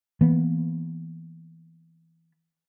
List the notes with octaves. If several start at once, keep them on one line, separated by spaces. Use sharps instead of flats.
E3 A#3 B3